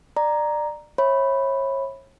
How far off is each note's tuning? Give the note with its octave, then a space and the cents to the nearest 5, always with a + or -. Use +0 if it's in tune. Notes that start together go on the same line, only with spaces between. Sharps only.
D5 +25 A#5 +0
C#5 -35 E5 -10 B5 +0